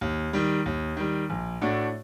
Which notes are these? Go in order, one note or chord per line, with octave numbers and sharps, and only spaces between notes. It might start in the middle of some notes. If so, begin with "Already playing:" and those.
D#2
D#3 G3
D#2
D#3 G3
A#1
A2 A3 D4 F#4